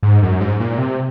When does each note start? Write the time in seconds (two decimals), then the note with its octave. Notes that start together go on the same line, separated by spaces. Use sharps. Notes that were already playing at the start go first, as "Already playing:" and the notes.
0.03 G#2
0.23 F#2
0.40 G#2
0.60 A#2
0.78 C3